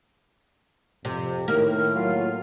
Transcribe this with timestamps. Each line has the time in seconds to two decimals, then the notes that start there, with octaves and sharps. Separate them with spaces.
1.05 F2 C3
1.48 A2 D#3 A#3 F6
1.95 F#3 F4